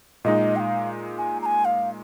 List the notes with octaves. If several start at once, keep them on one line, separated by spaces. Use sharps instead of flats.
A#2 G#3 D#4 D#5
G5
F5
G#5
A#5
G#5
F5